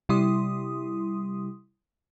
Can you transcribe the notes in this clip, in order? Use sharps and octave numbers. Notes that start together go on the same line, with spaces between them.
C3 G3 E4 C6 D#6